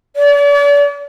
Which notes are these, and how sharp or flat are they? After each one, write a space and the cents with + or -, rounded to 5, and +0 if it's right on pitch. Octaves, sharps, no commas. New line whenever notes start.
D5 -40